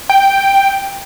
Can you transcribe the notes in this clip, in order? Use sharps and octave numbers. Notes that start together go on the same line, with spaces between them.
G5